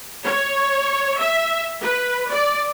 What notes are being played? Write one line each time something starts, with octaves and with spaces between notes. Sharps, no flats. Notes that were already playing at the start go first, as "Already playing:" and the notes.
C#5
E5
B4
D5